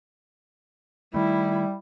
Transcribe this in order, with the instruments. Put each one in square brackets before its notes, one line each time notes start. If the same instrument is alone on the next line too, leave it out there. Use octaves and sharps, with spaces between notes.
[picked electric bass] D#3 A3 [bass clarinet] G3 [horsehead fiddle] E4